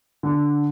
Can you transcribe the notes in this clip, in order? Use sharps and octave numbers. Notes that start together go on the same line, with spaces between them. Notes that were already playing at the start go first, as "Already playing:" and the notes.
D3